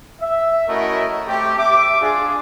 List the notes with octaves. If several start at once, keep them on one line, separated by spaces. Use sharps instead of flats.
E5
A3 C#4 E4 F#4 A#4 D#5
A3 C4 G4
E5 D6
D4 F4 G#4